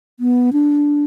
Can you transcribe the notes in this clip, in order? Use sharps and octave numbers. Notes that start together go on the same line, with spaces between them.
B3
D4